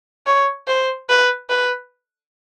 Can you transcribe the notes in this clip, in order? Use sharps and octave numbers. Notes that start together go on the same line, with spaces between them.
C#5
C5
B4
B4